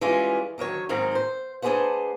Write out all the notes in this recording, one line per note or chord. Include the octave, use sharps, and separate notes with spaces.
E3 G3 G#3 C#4 F4
D3 D#3 F#3 C#5
G#2 D#3 F#3 C4
C5
A3 D4 G#4 B4 C5 F#5